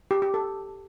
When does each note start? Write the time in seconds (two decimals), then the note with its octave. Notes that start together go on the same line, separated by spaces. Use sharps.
0.11 G4
0.22 G4
0.34 A4